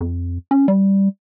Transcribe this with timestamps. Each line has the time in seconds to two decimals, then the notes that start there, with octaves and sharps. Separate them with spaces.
0.01 F2
0.51 C#4
0.68 G3